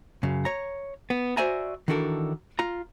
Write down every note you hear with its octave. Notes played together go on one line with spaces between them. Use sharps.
F#2 C#3
C#5 A#5
B3
F#4 C5 D5 E5 G#5 A#5
D#3 E3 D4 F#4 A4 A#4
F4 A#5